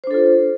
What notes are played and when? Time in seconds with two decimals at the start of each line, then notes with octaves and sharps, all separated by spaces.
0.04 C5
0.07 D4
0.11 A4
0.14 F4